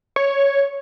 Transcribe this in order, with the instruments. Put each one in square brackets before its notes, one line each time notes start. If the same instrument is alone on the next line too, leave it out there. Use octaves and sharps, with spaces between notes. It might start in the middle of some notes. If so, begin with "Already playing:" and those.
[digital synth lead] C#5